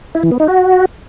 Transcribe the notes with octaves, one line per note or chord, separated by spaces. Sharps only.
E4
E3
B3
D#4
F#4